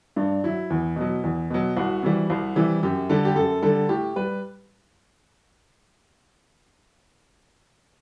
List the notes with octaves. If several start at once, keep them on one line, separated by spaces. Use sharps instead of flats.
G2 D4
F#3 E4
E2
B2 F#3
E2
B2 F#3
C2 F#4
C3 E3 G3
C2
C3 E3 G3
F#2 G4
D3 G3 A4
G4
F#2 A4
D3 G3 A4
A2 G4
G3 B4